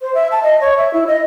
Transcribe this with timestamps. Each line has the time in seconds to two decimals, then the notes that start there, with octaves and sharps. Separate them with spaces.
0.01 C5
0.14 E5
0.32 A5
0.43 D#5
0.61 C#5
0.77 E5
0.93 E4
1.07 D#5